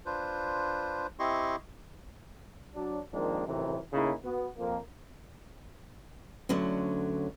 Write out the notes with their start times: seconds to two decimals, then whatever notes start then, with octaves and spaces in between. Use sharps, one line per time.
0.06 D4 F4 B4 C5
1.19 C4 E4 G4 D#5 C6 C#6
2.75 F#3 D4
3.14 D#3 F3 G#3 A#3 C4 D4
3.47 F#2 A2 C3 D#3 E3
3.93 A2 C#3 A#3 D#4 E4 G#4
4.25 B3 F#4
4.58 F2 A#3
6.49 D2 D3 F#3 C#4